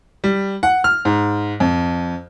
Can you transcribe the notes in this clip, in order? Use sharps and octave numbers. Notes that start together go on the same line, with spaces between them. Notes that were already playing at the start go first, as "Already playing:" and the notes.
G3
F#5
F6
G#2
F2